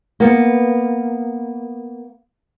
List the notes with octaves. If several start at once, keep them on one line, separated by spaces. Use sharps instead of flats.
A#3 B3